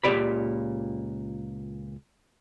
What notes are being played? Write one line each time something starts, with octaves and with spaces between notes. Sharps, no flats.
C#2 A#2 A3 G4 D5 B5